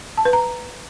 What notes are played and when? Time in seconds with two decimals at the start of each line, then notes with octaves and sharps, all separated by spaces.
0.18 A5
0.25 B4
0.33 A#5